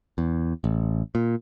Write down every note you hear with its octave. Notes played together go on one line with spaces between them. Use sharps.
E2
A1
A#2